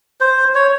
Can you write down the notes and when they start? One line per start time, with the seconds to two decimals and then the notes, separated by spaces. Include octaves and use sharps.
0.21 C5
0.55 C#5